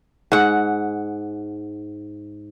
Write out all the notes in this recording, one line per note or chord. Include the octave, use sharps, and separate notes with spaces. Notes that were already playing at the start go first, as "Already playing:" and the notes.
G#2 F#5